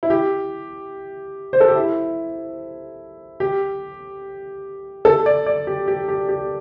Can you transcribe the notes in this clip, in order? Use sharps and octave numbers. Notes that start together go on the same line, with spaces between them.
E4
G4
C5
A4
G4
E4
G4
A4
D5
D5
G4
G4
G4
G4